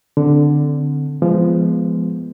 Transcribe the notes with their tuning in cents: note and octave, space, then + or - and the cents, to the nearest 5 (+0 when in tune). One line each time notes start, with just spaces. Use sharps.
D3 +0 C4 -25
F3 -20 G#3 +0 B3 +0